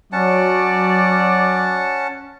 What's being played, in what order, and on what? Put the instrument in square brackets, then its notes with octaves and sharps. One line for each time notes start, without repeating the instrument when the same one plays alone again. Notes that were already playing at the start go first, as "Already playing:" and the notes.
[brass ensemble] F#3 D5 [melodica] C#4 F#5 A5